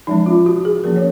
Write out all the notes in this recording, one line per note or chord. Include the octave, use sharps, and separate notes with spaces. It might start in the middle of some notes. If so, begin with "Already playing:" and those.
F3 G#3 C#4 D#4
F4
F#4
G#4
F3 A#3 C#4 A#4
C#5